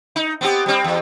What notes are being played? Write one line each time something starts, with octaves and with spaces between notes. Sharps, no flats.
D#4
B3 C4 G4
G3 C4
E2